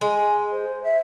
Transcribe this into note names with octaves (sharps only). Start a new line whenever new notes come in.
G#3 G#5
C5
E5